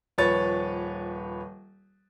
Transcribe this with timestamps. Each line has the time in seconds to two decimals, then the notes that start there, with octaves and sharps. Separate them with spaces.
0.18 D#1 F3 B4 C#5 A6